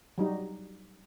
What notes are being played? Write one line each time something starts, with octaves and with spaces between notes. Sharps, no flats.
F#3 G3 D#4